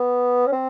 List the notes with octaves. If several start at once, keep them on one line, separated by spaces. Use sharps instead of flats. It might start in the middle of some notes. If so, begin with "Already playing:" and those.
Already playing: B3
C#4
C4